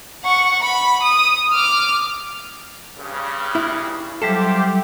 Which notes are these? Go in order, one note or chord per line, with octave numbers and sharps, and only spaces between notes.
F#5 C#6
B5
D#6
D6 F6
G2 C#3
E4
F#3 G3 C4 F4 G4 A4 E5